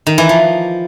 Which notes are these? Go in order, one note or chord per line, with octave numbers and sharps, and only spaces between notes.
D#3
E3
F3